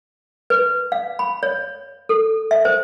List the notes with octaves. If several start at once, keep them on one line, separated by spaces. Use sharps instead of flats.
B4
F5
B5
C#5
A4
E5
C5